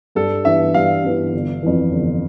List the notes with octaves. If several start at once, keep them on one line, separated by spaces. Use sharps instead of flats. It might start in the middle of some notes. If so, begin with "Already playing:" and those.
G2 A4
E3 B3 D4 E5
G2 F5
E3 B3 D4
G1
F2 E3
G1